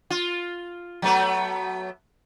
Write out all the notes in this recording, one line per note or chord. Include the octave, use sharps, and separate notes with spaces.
F4
F#3 A3 B3